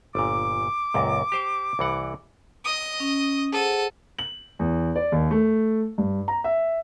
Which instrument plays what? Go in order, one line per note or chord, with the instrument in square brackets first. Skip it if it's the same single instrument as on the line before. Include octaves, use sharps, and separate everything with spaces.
[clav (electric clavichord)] G1 A#2 [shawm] D6
[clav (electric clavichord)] C#2 F#2 A#2
G4 C5 G5
C2 E3 F#5
[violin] D#5 D#6
[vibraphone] C#4
[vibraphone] G#4 C5 F#5 [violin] A4 D#7
[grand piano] F#7
E2
D5
D#2
A3
G2
A#5
E5